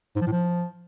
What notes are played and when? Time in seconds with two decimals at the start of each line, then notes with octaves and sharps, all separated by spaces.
0.16 G#2
0.21 F3
0.27 A2
0.32 F3